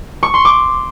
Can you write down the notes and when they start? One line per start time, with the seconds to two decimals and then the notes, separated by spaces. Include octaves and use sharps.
0.23 C#6
0.34 C6
0.45 D6